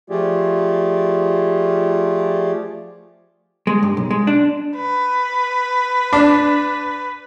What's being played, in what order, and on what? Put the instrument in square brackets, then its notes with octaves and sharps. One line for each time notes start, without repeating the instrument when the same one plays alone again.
[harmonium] F3 A3 F4 G4 G#4 D5
[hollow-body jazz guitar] G#3
G2
B1
G#3
D4
[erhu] B4
[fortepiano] D4